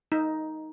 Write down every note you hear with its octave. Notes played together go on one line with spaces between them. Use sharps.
D#4